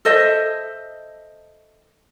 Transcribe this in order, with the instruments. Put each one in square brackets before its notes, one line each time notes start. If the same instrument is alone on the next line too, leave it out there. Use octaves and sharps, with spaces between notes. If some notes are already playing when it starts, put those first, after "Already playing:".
[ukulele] A4 C5 D#5 E5